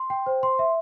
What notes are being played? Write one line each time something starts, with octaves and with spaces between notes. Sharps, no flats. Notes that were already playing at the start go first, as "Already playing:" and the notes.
Already playing: C6
G5
C5
C6
E5